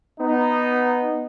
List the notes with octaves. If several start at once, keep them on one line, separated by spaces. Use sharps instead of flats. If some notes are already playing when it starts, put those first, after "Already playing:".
B3 D#4